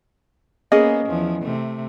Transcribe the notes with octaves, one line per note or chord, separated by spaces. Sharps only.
A#3 B3 C#4 G#4 D#5
E2 F3
C3 A3